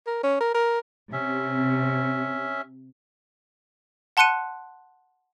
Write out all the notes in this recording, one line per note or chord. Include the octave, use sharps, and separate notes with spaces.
A#4
C#4
A#4
A#4
C3 C#4 E5
F#5 A5 C6 F#6 C#7 D#7